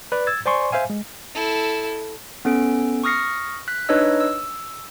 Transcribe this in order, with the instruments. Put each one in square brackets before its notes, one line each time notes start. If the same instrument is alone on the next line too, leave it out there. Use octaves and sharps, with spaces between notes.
[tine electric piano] B4 D5
E6 G#6 A6
C5 D5 G#5 C6 C#6
C5 E5 F5 G#5
G#3
[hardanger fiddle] E4 A4
[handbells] B3 C#4 A4 D7
C#6 D#6 F6 A#6 C7 C#7
F#6 B6
D4 D#4 B4 C#5 D#5 E6
E6